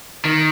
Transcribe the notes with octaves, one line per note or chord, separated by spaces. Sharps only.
D#3